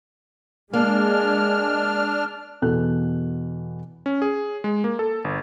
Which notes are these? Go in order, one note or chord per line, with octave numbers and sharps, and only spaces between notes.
G#3 A#3 D4 F6
E2 B2 A4 F#6
C#4
G#4
G#3
A#3
A4
G1